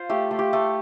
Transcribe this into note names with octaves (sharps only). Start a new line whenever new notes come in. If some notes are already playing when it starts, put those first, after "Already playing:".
Already playing: F4 C5 F5
A3 G4
A3
G4
A3